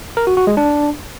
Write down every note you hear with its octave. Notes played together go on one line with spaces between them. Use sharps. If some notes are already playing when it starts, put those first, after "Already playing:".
A#4
F#4
F#4
G#3
D4